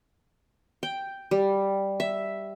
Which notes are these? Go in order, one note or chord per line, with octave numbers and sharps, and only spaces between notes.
G5
G3
E5